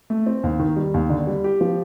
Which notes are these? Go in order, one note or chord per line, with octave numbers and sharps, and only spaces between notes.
A3
C4
D#2
D#3
G3
D#2
D3
G3
G4
F3